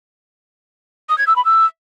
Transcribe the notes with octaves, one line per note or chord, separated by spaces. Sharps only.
D#6
G#6
E6
B5
E6